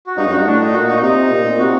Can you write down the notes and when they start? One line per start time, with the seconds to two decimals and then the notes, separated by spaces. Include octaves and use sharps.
0.07 F#4
0.17 G2 D#4
0.27 F#2 F#4
0.37 G2
0.46 A2 D4
0.60 D#4
0.73 A#2 F#4
0.88 D#4
1.02 C3 D#4
1.31 A#2
1.45 A#2
1.59 C3 F#4